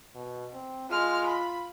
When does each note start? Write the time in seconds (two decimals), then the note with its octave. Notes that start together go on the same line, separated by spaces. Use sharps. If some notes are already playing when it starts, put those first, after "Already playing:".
0.15 B2
0.54 C4
0.90 G#3 F4 F6
1.27 B5